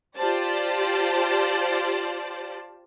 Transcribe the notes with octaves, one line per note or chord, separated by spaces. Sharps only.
F4 G4 C5 D5 A5